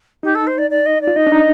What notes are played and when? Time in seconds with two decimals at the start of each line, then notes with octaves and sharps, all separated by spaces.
0.23 D#4 G4
0.35 A4
0.47 C5
0.58 D5
0.70 D5
0.86 D#5
1.01 D5
1.07 F4
1.16 D#4 D#5
1.27 D4
1.32 D#4